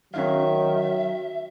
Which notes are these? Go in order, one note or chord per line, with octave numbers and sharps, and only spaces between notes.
D#3 F#3 C#4 D#4 E5 F5